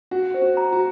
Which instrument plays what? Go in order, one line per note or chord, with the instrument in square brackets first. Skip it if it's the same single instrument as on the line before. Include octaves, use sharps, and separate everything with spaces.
[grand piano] F#4 [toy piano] F#5
[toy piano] C5
[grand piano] F#4
[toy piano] A#5
[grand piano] F#4